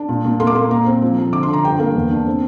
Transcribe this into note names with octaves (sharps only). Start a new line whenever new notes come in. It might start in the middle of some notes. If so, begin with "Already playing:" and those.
Already playing: D4
A#2
A#2
A#3 C6
D6
A#3 C6
A#2 A#5
C4
F3
F3
D3 D6
C6
D3
A#5
G2 G5
A#3
E2
D4
C4